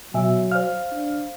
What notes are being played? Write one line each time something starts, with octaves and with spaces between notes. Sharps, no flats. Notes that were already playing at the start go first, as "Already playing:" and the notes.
B2 F#3 E5 G#5
C5 D5 F5 F6
D4